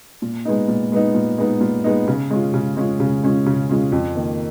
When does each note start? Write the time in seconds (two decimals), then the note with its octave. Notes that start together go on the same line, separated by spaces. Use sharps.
0.22 A#2
0.45 G#3 B3 D#4
0.68 A#2
0.92 G#3 B3 D#4
1.15 A#2
1.38 G#3 B3 D#4
1.61 A#2
1.84 G#3 B3 D#4
2.08 C#3
2.30 G#3 C#4 F4
2.54 C#3
2.77 G#3 C#4 F4
3.00 C#3
3.23 G#3 C#4 F4
3.46 C#3
3.69 G#3 C#4 F4
3.92 F2
4.15 D#3 A#3